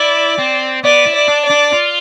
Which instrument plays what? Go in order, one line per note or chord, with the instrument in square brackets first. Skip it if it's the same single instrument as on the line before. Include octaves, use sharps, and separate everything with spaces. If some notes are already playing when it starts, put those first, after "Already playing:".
Already playing: [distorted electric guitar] E4 [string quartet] D5
[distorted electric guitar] C4
[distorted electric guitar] B3 [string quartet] D5
[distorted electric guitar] E4
[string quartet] D5
[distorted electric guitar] D4
[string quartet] D5
[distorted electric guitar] D4
F4